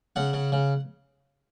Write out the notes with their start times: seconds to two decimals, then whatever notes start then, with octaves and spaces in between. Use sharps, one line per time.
0.16 C#3 F#5
0.33 C#3
0.52 C#3